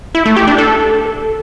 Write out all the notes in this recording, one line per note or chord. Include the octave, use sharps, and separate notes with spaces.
E4
A3
G4
D4
A4